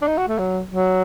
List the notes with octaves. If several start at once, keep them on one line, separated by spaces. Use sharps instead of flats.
D4
D#4
F#4
A3
F#3
F#3